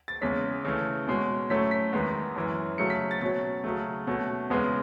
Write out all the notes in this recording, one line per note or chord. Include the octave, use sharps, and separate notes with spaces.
A6
E2 C#3 G#3 C#4 B6
C#3 E3 A3
B2 G#3 C#4
A2 F#3 A3 C#4 B6
B6
E2 D#3 G#3 B3
F#2 E3 G#3 C#4
C#3 F#3 A3 C#7
B6
A6
B2 F#3 C#4 A6
C#3 F#3 A3
B2 A3 C#4
E2 C#3 G#3 B3